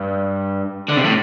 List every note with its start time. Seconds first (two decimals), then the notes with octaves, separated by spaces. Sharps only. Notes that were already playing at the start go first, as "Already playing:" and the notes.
Already playing: G2
0.88 D3
0.97 C3
1.04 A2